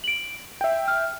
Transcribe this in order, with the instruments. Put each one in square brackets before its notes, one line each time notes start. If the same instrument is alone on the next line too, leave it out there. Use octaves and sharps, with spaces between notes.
[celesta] D7 F#7
[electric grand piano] E5 G5
[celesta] F6